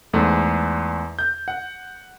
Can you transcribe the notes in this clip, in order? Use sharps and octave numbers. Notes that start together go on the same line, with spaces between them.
E2 G#2 A3
G6
F#5